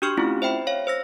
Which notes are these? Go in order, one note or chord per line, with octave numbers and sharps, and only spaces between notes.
D4 F#4 G4 C#6 F6
A3 C4 C#4 E4 F4
C5 E5 G5 B5
C#5 F5
C5 E6 A#6